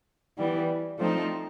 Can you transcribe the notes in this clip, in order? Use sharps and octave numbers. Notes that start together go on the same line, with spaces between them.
E3 G3 B3
F3 A3 C4 D#4